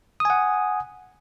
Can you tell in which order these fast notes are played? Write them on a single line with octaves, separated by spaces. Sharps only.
D#6 G#5 F#5